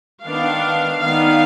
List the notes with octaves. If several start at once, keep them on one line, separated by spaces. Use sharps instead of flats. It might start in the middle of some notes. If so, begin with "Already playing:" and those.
D#3 B3 D4 F5
D#3 B3 D4 F5